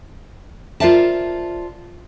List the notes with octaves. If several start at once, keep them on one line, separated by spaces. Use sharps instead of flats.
F4 A#4 C5 D5 E5 A5